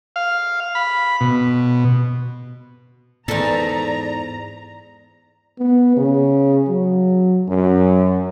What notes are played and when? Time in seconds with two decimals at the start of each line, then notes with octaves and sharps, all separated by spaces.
0.16 F5
0.75 B5
1.21 B2
3.28 E2 G#2 A4 D5 A#5
5.59 B3
5.97 C#3
6.68 F#3
7.49 F#2